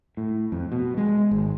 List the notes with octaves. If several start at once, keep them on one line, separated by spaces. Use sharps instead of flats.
A2
F2
B2
G#3
G#1